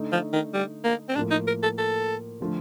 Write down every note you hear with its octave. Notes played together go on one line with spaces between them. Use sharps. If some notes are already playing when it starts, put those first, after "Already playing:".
Already playing: D3 A3 D#4
F3
D#3
G3
A#3
C4
A2 F3 A#3 D4
D#4
A#4
A4
A4
D3 F3 A3